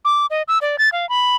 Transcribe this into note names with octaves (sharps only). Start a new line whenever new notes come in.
D6
D#5
E6
D5
A6
F5
B5